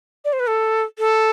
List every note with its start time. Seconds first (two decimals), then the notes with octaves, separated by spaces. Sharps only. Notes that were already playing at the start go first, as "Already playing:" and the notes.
0.25 D5
0.33 C5
0.40 B4
0.47 A4
0.99 A4